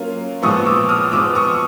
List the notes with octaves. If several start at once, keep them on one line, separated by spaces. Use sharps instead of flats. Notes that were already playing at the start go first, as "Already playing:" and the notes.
Already playing: F#3 A#3 C#4 F4
A#2 F3 G#3 B3 C#6 D#6
D6 E6
D#6 F6
F3 G#3 B3 D6 E6
C#6 D#6